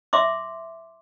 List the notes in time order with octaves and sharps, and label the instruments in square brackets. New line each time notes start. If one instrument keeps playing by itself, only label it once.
[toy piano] E5 C6 D6